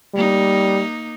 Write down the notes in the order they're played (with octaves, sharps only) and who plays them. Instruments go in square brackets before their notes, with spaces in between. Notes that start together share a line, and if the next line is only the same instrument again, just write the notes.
[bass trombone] G3 [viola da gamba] A#3 D#4